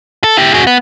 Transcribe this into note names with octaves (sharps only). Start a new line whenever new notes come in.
A4
E4 G4
F#4 G#4
B3